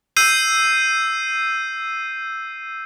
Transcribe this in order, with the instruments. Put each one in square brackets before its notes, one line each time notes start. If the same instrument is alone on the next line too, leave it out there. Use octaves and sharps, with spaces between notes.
[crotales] E6 G6 C7 D#7